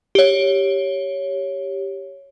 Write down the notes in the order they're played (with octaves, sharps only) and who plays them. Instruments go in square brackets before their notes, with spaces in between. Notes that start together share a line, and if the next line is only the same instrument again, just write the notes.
[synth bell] G4 C#5